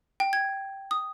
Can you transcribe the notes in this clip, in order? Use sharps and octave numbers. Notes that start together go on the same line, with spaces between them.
G5
G#6
D#6